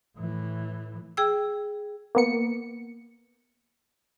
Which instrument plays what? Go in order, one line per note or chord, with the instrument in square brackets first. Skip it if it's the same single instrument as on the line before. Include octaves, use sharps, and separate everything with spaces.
[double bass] A2 E3
[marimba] G#4 G5 E6
[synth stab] A#3 B3 C#7